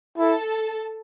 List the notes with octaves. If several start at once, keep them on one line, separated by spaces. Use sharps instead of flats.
E4 A4